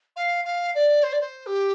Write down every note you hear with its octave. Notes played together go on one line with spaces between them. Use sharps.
F5
F5
D5
C5
D5
C5
G4